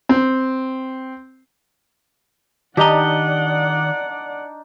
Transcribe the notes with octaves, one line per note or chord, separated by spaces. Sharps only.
C4
D#3 D4 D#4 G4 D5 D#5 F#5 A#5